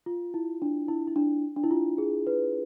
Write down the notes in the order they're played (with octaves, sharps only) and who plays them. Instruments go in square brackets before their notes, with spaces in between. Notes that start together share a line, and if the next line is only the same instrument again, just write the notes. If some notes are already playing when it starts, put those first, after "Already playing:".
[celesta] F4
E4
D4
E4
E4
D4
D4
E4
F4
G#4
B4